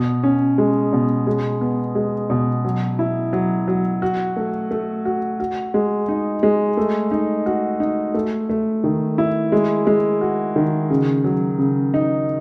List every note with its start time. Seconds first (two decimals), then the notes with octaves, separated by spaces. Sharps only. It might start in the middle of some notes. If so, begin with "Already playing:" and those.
Already playing: B2
0.23 C#4
0.58 G#3
0.93 B2
1.27 G#3
1.61 B3
1.95 G#3
2.30 B2
2.65 F#3
2.99 E4
3.33 F#3
3.68 F#3
4.02 F#4
4.36 A3
4.71 A3
5.05 F#4
5.40 F#4
5.74 G#3
6.08 D#4
6.43 G#3
6.77 A3
7.11 D#4
7.46 F#4
7.80 D#4
8.14 A3
8.50 A3
8.84 D#3
9.18 E4
9.52 G#3
9.87 G#3
10.21 F#4
10.56 D#3
10.90 C#3
11.24 F#3
11.59 C#3
11.94 D#4